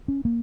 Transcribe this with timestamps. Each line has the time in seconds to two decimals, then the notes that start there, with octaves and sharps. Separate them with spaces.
0.08 C#4
0.25 A#3